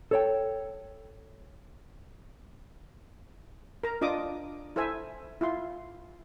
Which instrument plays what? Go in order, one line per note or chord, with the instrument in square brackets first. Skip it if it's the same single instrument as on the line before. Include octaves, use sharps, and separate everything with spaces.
[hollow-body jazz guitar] A4 C#5 G5
[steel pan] A#4 A#5
D4 F4 D#5 D6 D#6
E4 A4 C5 E5 G#5
E4 F4 C6